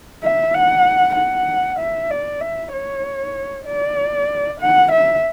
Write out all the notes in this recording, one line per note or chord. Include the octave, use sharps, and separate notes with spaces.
E5
F#5
F#5
E5
D5
E5
C#5
D5
F#5
E5